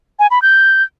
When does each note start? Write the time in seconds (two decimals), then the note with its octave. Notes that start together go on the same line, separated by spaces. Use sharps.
0.19 G#5
0.31 B5
0.42 G6